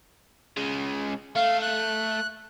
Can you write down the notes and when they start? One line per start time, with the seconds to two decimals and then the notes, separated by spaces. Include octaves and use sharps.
0.57 C#3 G#3
1.36 A3 F5
1.62 F#6